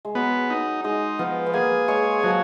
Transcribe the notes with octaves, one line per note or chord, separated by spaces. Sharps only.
G#3
F#3 B3
D#4
G#3 D#4
F3 B3
B3
A#3 G#4
G#3 C#5
F3 F#3